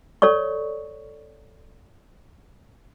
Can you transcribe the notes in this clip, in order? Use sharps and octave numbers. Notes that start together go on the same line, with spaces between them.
A4 C#5 D5 C#6